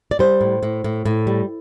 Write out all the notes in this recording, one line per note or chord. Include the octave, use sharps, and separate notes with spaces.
D5
G3 C5
A2
A2
A2
A2
G3